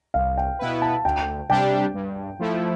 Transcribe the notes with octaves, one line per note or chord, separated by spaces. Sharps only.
C2 F5
G5
B2 B3 E4 B4
A5
D2 G5
C3 G3 D4 G4 G5
G2
F3 A3 E4